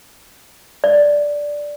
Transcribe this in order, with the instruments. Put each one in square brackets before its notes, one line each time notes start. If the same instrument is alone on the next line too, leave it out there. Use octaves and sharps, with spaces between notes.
[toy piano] D5